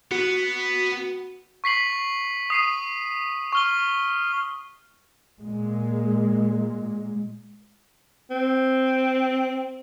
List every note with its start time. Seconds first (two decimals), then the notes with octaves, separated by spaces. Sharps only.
0.11 B3 F#4
1.64 C#6 B6 C7 F#7
2.50 D#6 C7 D#7
3.52 C#6 F6 G7
5.41 A#2 G#3
8.31 C4